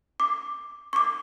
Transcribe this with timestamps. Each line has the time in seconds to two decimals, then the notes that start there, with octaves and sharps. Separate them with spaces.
0.20 D6
0.93 C#6 D6